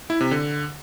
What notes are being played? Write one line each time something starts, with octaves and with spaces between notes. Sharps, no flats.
E4
C3
D3